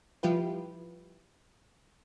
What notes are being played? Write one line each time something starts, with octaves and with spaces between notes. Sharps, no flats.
F3 G3 E4 F4 G4 B4